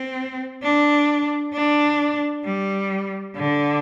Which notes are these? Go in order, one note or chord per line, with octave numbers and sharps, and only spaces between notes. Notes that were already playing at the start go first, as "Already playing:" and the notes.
Already playing: C4
D4
D4
G3
D3